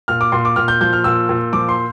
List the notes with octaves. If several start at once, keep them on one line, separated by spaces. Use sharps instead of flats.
A#2 F6
D6
A#2 C6
D6
A#2 F6
G6
F3 G6
F6
A#2 E6
A#2
F3 D6
C6